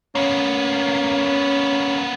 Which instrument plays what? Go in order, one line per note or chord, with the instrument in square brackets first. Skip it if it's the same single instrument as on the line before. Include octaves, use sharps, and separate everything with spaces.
[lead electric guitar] A#3 B3 [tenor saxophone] C#4